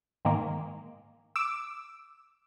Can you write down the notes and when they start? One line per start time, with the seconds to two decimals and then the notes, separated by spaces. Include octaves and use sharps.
0.25 G#2 D#3 G#3 A#3
1.36 D6 E6